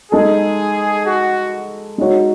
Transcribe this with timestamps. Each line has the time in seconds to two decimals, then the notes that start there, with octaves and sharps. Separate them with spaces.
0.12 G#3 D#4 G#4 A4
1.06 F#4
1.98 G#3 D#4 F#4 C#5